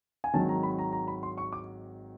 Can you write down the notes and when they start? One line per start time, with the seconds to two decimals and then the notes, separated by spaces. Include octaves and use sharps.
0.24 G#5
0.34 G#1 G#2 D#3 F#3 A5
0.49 A#5
0.63 B5
0.79 A#5
0.93 A#5
1.08 B5
1.23 C6
1.38 C#6
1.53 D6